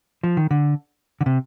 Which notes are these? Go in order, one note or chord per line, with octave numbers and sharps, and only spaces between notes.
F3
D#3
D3
D3
C3